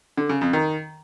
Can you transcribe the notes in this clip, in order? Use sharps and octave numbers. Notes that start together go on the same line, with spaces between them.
D3
C#3
F2
D#3